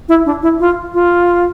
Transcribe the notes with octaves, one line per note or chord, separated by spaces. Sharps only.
E4
D4
E4
F4
F4